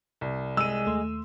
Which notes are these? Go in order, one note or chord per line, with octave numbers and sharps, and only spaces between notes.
C2
G#3 E6 D#7
D#2 A3 C6